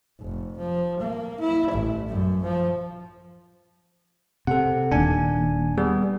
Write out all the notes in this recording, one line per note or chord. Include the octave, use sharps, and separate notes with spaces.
F1
F3
A#3
E4
A1
F#2
F3
C3 A4 F#5
D#1 D#2 D4 G#5
G3 B3 G#4